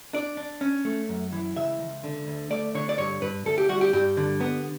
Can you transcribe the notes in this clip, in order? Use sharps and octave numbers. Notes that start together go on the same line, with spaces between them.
D4 D5
D4
C#4
A3
F#2
E3
C#2 E5
C#2
D3
D2
A3 D5
D3 C#5
D5
G2 C#5
G2 B4
D2 A4
G4
G3 F#4
G4
G2 G4
D3
B3